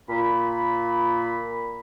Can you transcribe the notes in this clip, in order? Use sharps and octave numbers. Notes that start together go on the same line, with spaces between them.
A#2 B5